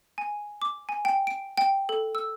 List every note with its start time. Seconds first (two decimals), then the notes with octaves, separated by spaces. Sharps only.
0.18 G#5
0.62 D6
0.89 G#5
1.05 G5
1.27 D7
1.57 G5
1.89 A4
2.15 E6